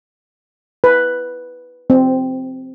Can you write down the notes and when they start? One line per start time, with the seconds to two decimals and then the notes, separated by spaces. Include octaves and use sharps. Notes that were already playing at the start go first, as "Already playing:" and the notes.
0.84 B4
1.90 C4